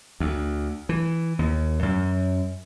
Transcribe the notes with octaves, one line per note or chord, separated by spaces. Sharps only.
D2
E3
D#2
F#2